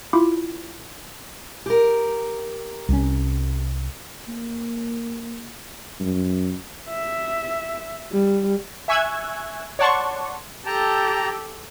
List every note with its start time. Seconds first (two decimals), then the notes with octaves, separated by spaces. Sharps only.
0.13 E4 F4 B5 D6
1.66 G4 A#4
2.89 C2 C#4
4.29 A#3
6.00 F#2
6.89 E5
8.12 G3
8.88 E5 G#5 C#6 E6 F#6 G#6
9.79 C#5 D5 F#5 A5 C6 C#6
10.66 G4 A4 G5 A5 A#5